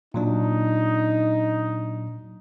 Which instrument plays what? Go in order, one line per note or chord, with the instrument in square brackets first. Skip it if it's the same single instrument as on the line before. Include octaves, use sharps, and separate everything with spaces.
[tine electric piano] A#2 F#3 D4 [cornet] D#4